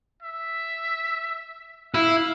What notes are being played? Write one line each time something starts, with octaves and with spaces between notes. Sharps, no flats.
E5
E4 F5